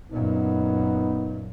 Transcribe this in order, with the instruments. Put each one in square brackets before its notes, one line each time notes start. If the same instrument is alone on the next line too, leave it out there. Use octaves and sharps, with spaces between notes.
[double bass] F#2 A#2 [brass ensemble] B3 D#4